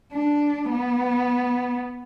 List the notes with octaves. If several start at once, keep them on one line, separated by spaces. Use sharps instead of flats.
D4
B3